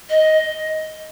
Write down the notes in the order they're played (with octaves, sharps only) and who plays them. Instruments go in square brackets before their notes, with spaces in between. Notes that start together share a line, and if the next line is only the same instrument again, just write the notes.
[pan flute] D#5